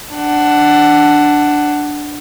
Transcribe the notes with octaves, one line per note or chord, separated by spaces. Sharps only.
D4 F#5